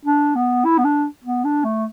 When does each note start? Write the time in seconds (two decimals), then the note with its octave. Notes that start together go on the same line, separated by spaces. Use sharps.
0.05 D4
0.36 B3
0.65 E4
0.78 B3
0.85 D4
1.24 B3
1.45 D4
1.64 A3